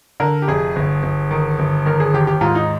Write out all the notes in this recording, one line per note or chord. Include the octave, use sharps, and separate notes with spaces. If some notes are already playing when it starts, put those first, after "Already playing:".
D3 A#4
G4
F1 G#4
G1
G1
D#3
G1
D#3 A#4
G#4
D#2 G4
G4
G#2 F4
D#4